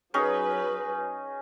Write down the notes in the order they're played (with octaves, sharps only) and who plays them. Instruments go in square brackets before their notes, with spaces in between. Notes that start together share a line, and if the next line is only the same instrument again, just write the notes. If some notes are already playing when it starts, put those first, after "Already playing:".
[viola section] F#3 B4 [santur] C#4 D#4 G#4